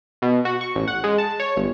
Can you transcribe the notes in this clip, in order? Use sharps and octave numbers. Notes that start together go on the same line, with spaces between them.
B2
F#4
C#6
A1
F#5
G#3
A5
C#5
G1